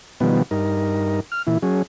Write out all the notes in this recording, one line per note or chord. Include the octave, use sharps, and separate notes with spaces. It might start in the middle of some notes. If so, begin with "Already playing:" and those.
B2 D#3 F3 G3 B3
G2 D#4 A#4
F6
A#2 E3 E4
F#3 C#4 G#4